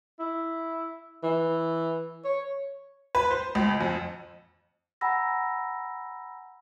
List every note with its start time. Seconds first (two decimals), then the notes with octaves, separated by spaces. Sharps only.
0.19 E4
1.23 E3
2.24 C#5
3.15 B4
3.31 C5
3.55 C#2
3.81 F2
5.01 F#5 G#5 A#5 B5 E6 A#6